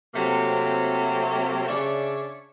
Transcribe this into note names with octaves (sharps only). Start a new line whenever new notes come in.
C3 F#3 A3 A#3 C4
C#3 D4 C#5 D5 E5